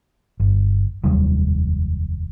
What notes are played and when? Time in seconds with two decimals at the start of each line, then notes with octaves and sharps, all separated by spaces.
0.40 G1
1.04 F1 D#2 F#3 G3